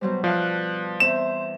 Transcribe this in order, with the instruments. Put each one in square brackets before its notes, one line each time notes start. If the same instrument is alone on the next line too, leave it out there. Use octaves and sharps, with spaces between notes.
[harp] B2 F#3 G3 [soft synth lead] C5
[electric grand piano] F3 [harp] D5 F5 A5 [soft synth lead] F#6
[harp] E2 C4 E5 [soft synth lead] C5 [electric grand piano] E7